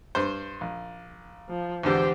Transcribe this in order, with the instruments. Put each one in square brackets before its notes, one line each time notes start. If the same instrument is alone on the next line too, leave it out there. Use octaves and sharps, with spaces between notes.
[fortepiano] G2 C5
A#1
[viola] F3
[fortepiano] E2 G#2 D3 [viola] G4 C5